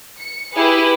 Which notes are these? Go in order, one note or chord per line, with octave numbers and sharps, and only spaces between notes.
C#7
E4 G4 G#4 B4